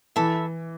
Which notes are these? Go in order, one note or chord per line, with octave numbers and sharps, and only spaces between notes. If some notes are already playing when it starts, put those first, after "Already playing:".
E3 A4 E5 B5